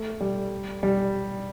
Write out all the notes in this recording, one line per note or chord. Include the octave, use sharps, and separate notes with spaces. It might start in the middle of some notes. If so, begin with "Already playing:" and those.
Already playing: A3
G3
G3